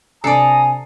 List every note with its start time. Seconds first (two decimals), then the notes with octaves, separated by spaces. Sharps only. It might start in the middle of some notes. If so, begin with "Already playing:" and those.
0.24 C3 D4 A4 D5 G#5 A#5 D#6 C7